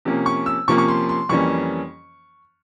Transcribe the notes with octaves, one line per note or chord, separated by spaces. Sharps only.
C3 F3 A#3 C#4
C#6
E6
C3 F3 A#3 C#4 C#6
C#6
C6
C6
F2 E3 G3 A#3 C#4 C#6